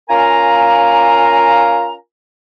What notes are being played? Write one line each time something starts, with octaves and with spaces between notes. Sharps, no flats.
C#4 F4 A#4 F5 G#5 A#5